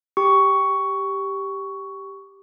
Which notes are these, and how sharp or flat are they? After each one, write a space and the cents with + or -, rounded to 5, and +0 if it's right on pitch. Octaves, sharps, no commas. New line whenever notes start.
G4 +0 C#6 +10